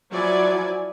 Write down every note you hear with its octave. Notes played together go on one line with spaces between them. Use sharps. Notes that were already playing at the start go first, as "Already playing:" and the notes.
F3 F#3 E4 D5 G#5